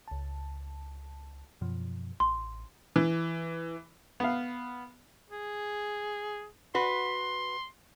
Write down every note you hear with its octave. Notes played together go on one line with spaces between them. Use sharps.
C#2 A5
F#2 B2 F3
A1 C6
E3
B3 F5
G#4
F#4 B4 C6